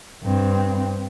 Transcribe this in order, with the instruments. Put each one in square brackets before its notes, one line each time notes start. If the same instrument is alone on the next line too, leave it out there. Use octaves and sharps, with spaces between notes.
[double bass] G2 C4